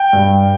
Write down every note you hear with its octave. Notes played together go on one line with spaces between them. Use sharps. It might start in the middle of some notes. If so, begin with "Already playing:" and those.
Already playing: G5
G2